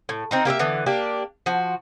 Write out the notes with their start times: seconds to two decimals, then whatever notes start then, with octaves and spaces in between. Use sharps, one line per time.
0.09 A2
0.31 C4 D#4 A#4
0.45 A#3 G4 A#4 E5
0.59 D3 E3 B3
0.86 A#3 D4 G4
1.46 F3 F#4